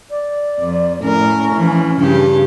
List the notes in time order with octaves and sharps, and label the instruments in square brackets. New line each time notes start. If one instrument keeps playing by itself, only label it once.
[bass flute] D5
[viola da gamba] F2
[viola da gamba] A2 A#4 [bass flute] C#4
[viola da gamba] E3 F3
[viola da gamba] G2 C#3 G4 [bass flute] D4